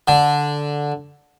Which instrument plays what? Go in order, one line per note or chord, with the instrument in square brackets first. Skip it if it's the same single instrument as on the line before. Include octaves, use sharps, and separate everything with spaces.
[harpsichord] D3